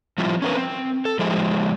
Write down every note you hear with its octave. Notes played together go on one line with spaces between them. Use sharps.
F3 G3 C4 E4 F4
C#4 A#4 B4
C4
A4
F3 G#3 E4 G4 G#4